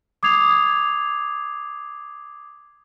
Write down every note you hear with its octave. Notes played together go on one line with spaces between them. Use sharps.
D6 D#6 G#6 C7 F7